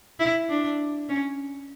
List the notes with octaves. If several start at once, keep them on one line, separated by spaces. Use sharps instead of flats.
E4
D4
C#4